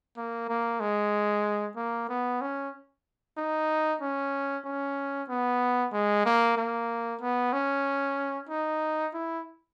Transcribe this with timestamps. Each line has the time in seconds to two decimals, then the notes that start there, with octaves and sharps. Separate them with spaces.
0.17 A#3
0.49 A#3
0.80 G#3
1.76 A#3
2.09 B3
2.41 C#4
3.38 D#4
4.02 C#4
4.66 C#4
5.29 B3
5.93 G#3
6.26 A#3
6.57 A#3
7.22 B3
7.53 C#4
8.49 D#4
9.14 E4